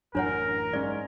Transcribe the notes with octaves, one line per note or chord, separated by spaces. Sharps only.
A1 F#2 F#3 D4 A#4 C#5 F#5
G#2 C#4 D5